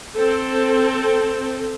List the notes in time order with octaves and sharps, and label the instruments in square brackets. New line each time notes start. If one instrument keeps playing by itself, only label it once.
[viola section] C4 A4